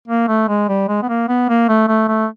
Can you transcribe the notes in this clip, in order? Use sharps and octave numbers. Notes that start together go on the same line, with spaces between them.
A#3
A3
G#3
G3
G#3
B3
A#3
B3
A#3
A3
A3
A3